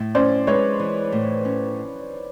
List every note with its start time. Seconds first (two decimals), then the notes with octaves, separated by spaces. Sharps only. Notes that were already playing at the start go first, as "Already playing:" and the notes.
Already playing: A2
0.15 C#4 C5 D5
0.47 G#3 B4 C#5
0.79 E3
1.12 A2
1.45 C#4